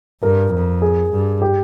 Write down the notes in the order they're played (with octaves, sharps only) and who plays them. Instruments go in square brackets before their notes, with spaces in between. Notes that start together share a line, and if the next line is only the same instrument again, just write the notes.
[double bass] G2 [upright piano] A#4
[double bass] F2
[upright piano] G#4
[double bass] G2
[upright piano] G4